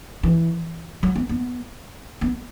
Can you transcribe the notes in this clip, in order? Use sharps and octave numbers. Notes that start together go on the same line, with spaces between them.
E3
F#3
B3
B3
B3